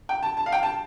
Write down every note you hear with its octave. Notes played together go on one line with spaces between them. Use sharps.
G5
A5
A5
F5
G5
A5